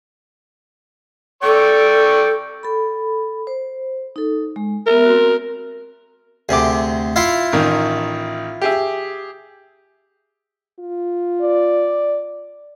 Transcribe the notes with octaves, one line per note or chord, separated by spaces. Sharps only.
A4 D5 G5 C#6
A4 B5
C5
D#4 A4
G#3
B3 A#4 E5
C4 F#4
D2 C3 G#4 D6
E4 F4 F5
A1 D#3
G4 G#4 E5
F4
D5